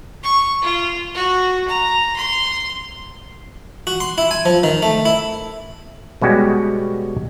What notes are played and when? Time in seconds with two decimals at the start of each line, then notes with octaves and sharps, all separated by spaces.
0.23 C#6
0.62 F4
1.14 F#4
1.68 A#5
2.16 C6
3.87 F#4
4.00 C6
4.18 E4
4.31 G#5
4.45 F3
4.63 D#3
4.82 A3
5.05 E4
6.22 B2 G3 G#3 C#4 F#4 G4